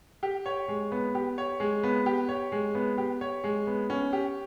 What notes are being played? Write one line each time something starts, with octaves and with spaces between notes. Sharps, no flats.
G4
C#5
G#3
B3
G4
C#5
G#3
B3
G4
C#5
G#3
B3
G4
C#5
G#3
B3
C#4
G4